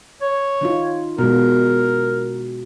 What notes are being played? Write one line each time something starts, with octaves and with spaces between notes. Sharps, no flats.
C#5
D#3 D#4 F4
B2 G#3 A#4